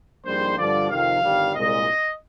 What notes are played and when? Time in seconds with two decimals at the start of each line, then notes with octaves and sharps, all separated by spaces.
0.24 A#1 G#2 G3 C5
0.57 G2 D3 F3 D5
0.90 F2 C3 D#3 F5
1.22 G1 G2 D#3 G3
1.54 C2 A#2 G#3 D#5